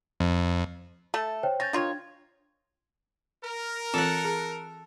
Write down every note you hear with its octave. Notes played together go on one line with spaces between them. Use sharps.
F2
A3 A4
C5 C#5 G5
C#4 G6 A6 A#6
D#3 D4 F4 C#5 G#6
A#4
E3 C4 F4 A4 F#5
G#4 A#5